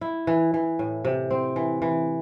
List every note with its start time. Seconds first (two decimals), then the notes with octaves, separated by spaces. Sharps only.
0.01 E4
0.27 E3
0.54 E3
0.79 A2
1.05 C3
1.31 C4
1.56 E3
1.82 E3